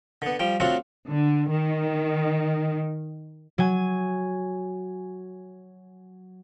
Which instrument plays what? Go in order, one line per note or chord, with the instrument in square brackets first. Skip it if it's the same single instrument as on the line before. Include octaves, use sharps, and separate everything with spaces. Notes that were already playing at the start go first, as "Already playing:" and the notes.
[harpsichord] D3 B3
F3 G3 G5
F#3 A3 C4 D4 F4 F#4
[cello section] D3
D#3
[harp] F#3 G#5